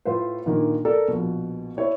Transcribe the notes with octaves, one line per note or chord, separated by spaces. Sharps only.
A2 F4 B4 C5
A#2 D3 D#3 A#3
A4 A#4 D5
A#1 B2
E4 C#5 D5